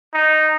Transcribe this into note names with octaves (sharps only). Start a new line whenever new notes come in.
D#4